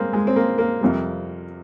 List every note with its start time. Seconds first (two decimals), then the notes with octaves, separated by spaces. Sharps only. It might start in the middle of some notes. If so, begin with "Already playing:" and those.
Already playing: G2 G#3 A#3 C4
0.13 G#3
0.27 C4
0.36 A#3
0.58 A#3
0.81 F2 C3 G3